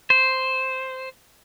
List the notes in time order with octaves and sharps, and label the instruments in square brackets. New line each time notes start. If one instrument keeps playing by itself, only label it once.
[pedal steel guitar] C5